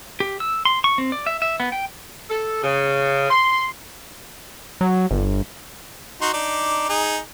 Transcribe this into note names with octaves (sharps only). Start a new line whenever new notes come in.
G4
E6
C6
C#6
C4
D5
E5
E5
B3
G5
A4
C#3
C6
F#3
G1
D#4 F#4 C6
D4 D#4 D6
D#4 G#4